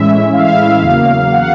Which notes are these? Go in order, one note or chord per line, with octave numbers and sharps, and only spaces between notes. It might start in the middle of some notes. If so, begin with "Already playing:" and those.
Already playing: A2 E3 G#3 C#4 E4 E5
F5
E2 C#3 F#3 A#3
F#5